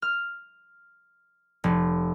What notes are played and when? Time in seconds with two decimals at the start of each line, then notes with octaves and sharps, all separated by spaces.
0.02 F6
1.64 F1